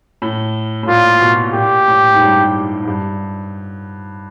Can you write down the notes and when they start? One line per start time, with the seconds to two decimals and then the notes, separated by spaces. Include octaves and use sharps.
0.22 A2
0.83 A2
0.88 A#2 F4
1.21 B2
1.54 A#2 G4
1.88 A2
2.14 G#2
2.21 G2
2.83 G#2
2.87 G2